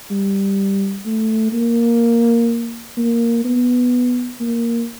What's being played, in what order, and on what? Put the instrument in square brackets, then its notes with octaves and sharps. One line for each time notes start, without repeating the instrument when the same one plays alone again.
[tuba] G3
A3
A#3
A#3
B3
A#3